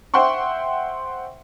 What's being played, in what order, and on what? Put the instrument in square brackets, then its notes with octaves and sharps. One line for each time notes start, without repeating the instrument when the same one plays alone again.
[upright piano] C5 E5 F#5 G5 C6 C#6